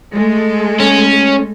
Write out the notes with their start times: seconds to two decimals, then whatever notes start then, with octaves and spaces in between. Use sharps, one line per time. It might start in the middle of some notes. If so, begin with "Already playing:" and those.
0.13 G#3 A3 A4
0.80 C#4